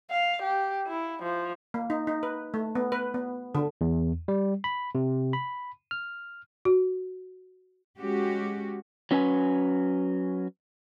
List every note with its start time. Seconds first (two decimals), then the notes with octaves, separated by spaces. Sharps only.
0.11 F5
0.42 G4
0.87 E4
1.23 F3
1.74 A#3
1.90 D#4
2.07 D#4
2.23 B4
2.54 A3
2.75 B3
2.92 B4
3.14 B3
3.55 D3
3.81 E2
4.28 G3
4.64 B5
4.95 C3
5.33 B5
5.91 F6
6.65 F#4
7.99 G#3 C#4 F#4 G4
9.11 F#3 C#4 B4 G5 G#5